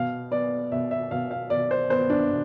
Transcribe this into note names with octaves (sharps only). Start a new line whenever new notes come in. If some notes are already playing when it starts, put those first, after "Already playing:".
Already playing: B2 F5
B3 D5
B2 E5
E5
B2 F5
F5
B2 D5
C5
B3 C5
D4
B2